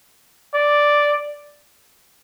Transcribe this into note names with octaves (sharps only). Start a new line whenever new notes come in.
D5